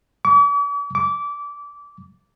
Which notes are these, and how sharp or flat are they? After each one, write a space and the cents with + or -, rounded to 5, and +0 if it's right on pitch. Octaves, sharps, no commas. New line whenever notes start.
D6 -45
D6 -20